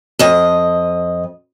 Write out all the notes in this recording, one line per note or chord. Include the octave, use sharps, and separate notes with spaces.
F2 D#5